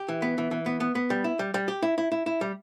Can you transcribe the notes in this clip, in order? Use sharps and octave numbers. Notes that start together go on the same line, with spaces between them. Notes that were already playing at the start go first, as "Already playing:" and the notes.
Already playing: G4
E3
B3
E3
E3
B3
B3
B3
G3
E4
G3
G3
G4
E4
E4
E4
E4
G3